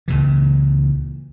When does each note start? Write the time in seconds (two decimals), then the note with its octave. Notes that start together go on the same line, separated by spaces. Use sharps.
0.08 C#2 A#2 E3